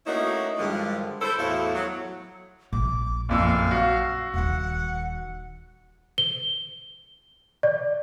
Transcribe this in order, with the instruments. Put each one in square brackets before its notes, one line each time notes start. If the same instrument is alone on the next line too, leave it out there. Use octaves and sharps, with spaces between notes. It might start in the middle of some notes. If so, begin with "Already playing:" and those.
[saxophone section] A3 A#3 C#4 D#4 E4 F#4
G2 D3 D#3 F3 G#3
E4 A4 C5
E2 A2 A3 E4 F#4 F5
F#3
[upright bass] A#1 [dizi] D6
[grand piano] F#1 F2 E6 [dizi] F5
[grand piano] F#4
[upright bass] D#1 D#3 [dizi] F#5
[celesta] G7
D5